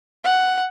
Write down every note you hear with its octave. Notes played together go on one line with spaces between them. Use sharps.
F#5